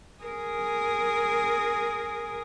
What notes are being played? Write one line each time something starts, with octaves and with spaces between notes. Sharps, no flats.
G#4 A#4